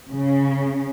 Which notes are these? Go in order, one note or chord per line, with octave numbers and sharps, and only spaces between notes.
C#3